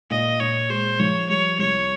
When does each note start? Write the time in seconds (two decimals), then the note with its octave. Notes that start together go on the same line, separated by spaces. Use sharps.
0.10 A#2 D#5
0.40 A#2 C#5
0.70 G#3 C5
0.99 F3 C#5
1.29 G3 C#5
1.59 C2 C#5